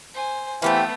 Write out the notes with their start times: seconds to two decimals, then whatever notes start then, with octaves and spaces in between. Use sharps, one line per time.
0.14 C5 G#5
0.62 E3 A3 B3 C4 G4 F5